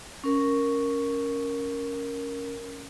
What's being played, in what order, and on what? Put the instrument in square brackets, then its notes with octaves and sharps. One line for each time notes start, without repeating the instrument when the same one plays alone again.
[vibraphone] C#4 A#4